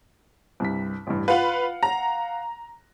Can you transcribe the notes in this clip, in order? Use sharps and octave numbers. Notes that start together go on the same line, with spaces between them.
C2 G2 B6
A1 G2
F4 B4 F5 F#5 F#6
A#5